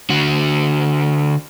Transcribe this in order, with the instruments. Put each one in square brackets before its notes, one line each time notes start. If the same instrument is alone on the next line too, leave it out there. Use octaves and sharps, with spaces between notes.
[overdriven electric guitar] D3 F#4